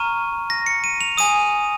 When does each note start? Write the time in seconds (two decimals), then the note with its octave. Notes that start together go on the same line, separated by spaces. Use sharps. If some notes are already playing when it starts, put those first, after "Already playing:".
Already playing: A#5 C#6 F6 D#7
0.50 A#6
0.66 C#7
0.84 D#7
1.01 F7
1.17 G#5 D#6 D#7